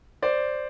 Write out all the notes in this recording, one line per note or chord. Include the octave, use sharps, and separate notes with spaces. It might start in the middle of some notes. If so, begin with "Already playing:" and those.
C5 D5